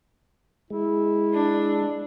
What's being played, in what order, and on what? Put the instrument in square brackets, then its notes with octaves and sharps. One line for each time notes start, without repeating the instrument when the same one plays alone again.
[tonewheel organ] G#3 [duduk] E4
[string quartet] D4